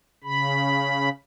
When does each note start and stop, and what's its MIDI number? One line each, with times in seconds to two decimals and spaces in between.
0.24 1.09 49
0.24 1.09 83